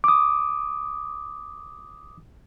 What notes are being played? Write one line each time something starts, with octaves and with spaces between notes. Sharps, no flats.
D6 D#6